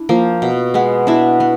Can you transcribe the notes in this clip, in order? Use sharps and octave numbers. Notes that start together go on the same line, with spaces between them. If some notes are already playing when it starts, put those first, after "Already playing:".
Already playing: D4 E4
F3 A#3
B2
G#3 B3
B2 D4 E4
B3